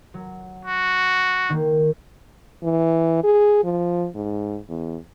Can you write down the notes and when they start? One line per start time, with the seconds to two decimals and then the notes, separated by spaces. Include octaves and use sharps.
0.14 F#3
0.65 F#4
1.49 D#3 A#3
2.63 E3
3.23 G#4
3.64 F3
4.15 G#2
4.69 E2